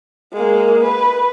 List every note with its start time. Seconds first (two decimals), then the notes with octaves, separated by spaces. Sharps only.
0.33 G#3 A#3
0.83 B4